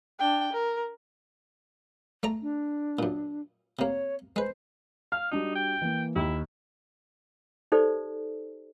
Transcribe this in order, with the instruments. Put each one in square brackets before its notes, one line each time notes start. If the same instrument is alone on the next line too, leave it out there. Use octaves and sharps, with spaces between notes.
[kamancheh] D4 G5
A#4
[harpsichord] A3 D5 A#5
[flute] D4
[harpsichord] F#2 A#2
[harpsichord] C3 A#3 [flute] C#5
[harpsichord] G#3 B4 [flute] C5
[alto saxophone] F5 [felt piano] F6
[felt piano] G3 D4 F#4 [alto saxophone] D#4
[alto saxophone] G5
[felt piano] E3 A#3
[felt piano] D#2 [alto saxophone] E4
[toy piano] D#4 G4 A4 C5 D5